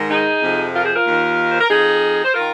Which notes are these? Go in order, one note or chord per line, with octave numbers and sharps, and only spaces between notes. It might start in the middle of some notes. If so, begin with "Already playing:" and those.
Already playing: G#2 D#3
D#4 G#4
F2 C3 F3
F4 A#4
G#4 C5
F4 A#4
D#2 D#3
C5
A#4
F2 F3 D#4 G#4
C5
D#3 F4 A#4